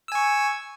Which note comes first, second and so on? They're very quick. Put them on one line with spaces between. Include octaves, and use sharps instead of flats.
E6 G#5 C#6